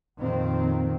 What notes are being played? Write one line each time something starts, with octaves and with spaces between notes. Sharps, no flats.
F2 A#2 D#3 C4